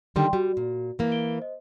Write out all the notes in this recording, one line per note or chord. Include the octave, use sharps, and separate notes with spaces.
D3 D#3 G3 G5 C6
G3 F#4
A#2
E3 A#3
D7 G7
C5 D#5